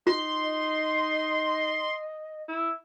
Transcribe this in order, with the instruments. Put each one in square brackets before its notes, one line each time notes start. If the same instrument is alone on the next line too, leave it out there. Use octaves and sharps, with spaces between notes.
[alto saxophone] D#4 [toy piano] F4 [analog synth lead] C6
[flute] D#5
[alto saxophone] E4